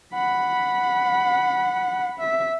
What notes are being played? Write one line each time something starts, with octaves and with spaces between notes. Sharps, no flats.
F#5 B5
E5